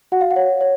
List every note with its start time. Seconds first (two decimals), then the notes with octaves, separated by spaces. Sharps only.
0.12 F#4 F#5
0.21 F5
0.31 F#5
0.36 C#5
0.61 C#5